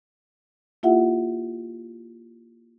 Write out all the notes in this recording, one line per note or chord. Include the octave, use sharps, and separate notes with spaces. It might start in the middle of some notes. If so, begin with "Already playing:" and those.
A#3 E4 F4 G4 E5 F#5